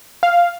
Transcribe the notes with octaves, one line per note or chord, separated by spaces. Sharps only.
F5